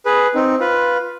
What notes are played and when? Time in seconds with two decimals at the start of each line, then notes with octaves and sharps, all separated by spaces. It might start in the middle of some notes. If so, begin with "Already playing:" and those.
0.06 G#4 B4
0.35 C4 D#4
0.60 F4 B4